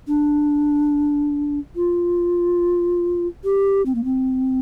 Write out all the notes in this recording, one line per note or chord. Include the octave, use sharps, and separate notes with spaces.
D4
F4
G4
C4
A#3
C4